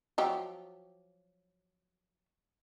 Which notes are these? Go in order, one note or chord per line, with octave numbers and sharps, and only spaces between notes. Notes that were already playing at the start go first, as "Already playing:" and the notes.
F3 F#3 G4